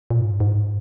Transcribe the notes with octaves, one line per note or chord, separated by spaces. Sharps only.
A#2
G#2
G2
G#2